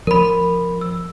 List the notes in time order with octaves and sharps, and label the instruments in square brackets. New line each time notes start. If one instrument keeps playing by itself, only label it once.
[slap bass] F3 [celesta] A#4 B5
[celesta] E6